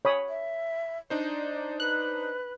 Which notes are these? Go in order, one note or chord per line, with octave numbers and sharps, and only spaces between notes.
C#5 B5 D#6
E5
D4 D#4 C5 D5
B4 F#6